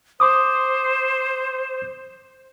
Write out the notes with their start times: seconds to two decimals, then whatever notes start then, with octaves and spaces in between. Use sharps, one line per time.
0.20 C5 C6 D6 D#6